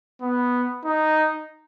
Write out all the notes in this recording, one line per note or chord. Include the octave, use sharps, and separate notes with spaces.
B3
D#4